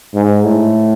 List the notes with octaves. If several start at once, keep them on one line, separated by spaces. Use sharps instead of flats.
G#2
A2